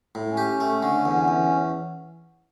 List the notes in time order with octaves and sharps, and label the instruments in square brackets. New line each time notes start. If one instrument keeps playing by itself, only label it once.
[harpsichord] A2
[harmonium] C#4
[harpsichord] G4
A3
D3
E2
E2